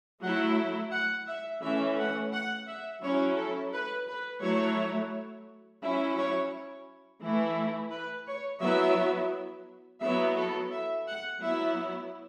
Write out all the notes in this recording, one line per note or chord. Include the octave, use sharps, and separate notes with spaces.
F#3 A3 E4 F#5
F#5
E5
E3 A3 C#4 E5
F#5
F#5
E5
F#3 C#4 E4 C#5
A4
B4
B4
F#3 A3 E4 C#5
F#3 C#4 E4 E5
C#5
E3 A3 E4
B4
C#5
F#3 B3 E4 E5
F#3 B3 E4 E5
A4
E5
F#5
F#3 B3 E4 E5